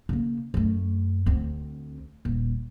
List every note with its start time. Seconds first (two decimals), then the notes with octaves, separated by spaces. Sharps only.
0.09 C#3 A#3
0.54 F#2 A3
1.26 D2 C4
2.25 D#1